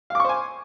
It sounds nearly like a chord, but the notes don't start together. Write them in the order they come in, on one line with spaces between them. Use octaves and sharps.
F5 D6 C#6 C5 G#5